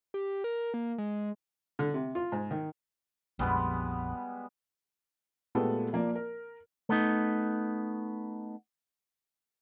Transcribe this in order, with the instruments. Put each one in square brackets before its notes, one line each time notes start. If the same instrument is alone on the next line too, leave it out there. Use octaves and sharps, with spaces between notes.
[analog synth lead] G4
A#4
A#3
G#3
[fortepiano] D3
C3
F4
G#2
D#3
[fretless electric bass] A#1 F2 [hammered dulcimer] G3 G#3 B3
[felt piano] A#2 G#3 A3 B3 G4 A4
F3 A#3 D5
A#4
[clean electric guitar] A3 B3 D#4